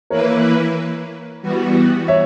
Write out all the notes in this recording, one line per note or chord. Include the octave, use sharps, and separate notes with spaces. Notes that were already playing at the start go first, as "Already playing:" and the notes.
E3 A#3 E4 A#4 B4 C#5
E3 G3 B3 F#4
C#5 E5